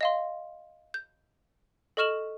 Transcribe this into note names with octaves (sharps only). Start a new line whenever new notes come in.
D#5 F5 C6
G6
A4 D#5 C#6 F6 E7 F#7